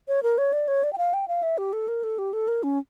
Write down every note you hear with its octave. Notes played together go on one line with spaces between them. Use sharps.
C#5
A#4
C#5
D5
C#5
D5
G5
F5
G5
F5
E5
G4
A4
A#4
A4
G4
A4
A#4
C#4